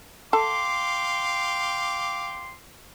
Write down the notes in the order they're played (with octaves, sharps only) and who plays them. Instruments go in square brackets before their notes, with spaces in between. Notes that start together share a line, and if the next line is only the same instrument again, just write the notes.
[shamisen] A4 [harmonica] F5 G5 D6 [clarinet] C6